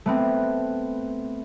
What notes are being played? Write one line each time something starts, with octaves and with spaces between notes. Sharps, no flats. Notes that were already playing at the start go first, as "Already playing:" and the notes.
A3 B3 C4